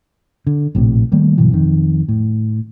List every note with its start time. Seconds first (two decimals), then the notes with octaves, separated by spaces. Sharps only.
0.47 D3
0.75 A#1 A2 C3
1.12 D#3 G3 A3 A#3
1.37 G1 B2 E3 F#3
1.52 F2 D#3
2.09 A2